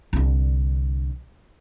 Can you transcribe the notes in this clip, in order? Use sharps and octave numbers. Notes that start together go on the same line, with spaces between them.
C2 D3